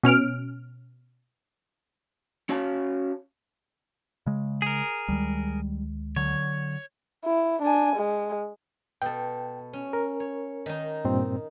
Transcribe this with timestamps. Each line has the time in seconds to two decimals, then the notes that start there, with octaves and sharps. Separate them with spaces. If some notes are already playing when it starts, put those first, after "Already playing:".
0.03 B2 C#4 F6 D7
2.49 C#4 F#4 C#5 F5 G#5 A5
4.26 C#3 G#3
4.62 G#4 A#4
5.08 D2 D#3 G3 G#3
6.16 D3 F#3 C#5
7.25 E4
7.62 D4 G#5
7.96 G#3
9.02 B2 A4 G5
9.73 C#4
9.93 A#4
10.20 C#5
10.66 D#3 D#4
11.05 G2 A#2 C4